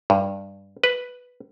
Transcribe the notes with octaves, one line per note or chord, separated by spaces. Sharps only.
G2
B4